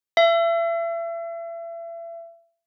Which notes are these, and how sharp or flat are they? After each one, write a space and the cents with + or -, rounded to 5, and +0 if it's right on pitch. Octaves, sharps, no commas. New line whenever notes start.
E5 +35